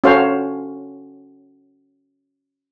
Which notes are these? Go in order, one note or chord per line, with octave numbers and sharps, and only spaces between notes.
C#4 F#4 A4 C5 F5